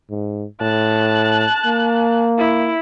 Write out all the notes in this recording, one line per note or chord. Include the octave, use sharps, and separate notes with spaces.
G#2
A2 A5 F#6
A#3
E4